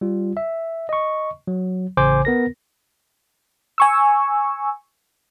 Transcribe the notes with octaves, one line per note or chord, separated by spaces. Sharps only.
G3 F4
E5
D#5 C#6
F#3
A1 C#3 C5 G#5 D6
B3 A#4 A#6
G#5 C#6 E6